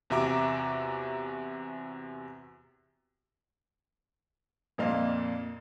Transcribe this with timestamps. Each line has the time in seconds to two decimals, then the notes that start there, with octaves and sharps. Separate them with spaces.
0.10 E2 C3 F#4 E5 A#5 D6
4.78 F2 A#2 A#3 D4 D#5 F5